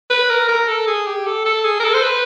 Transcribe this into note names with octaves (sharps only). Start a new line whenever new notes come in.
B4
A#4
A#4
A4
G#4
G4
A4
A4
G#4
A#4
A4
C5
B4